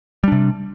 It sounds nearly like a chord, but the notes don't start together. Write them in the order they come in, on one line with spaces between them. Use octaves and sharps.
G3 D4 C3